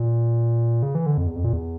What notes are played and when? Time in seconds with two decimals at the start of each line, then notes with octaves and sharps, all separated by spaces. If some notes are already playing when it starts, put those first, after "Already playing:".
Already playing: A#2
0.83 C#3
0.95 E3
1.06 D3
1.18 F2
1.27 E2
1.36 F2
1.44 A#2
1.53 E2